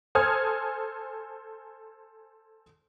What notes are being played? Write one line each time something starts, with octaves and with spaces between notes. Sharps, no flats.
A4 C5 G#5 D#6 F6 G#6